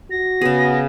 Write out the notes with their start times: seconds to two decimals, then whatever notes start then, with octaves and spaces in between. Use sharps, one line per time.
0.11 F#4 A#6
0.41 C#3 B3 G#4